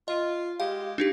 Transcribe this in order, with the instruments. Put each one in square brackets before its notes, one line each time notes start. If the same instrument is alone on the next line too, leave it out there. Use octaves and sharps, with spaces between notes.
[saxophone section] F4 [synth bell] D#5
[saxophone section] G#3 G4 [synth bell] F5
[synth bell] D4 D#4 G4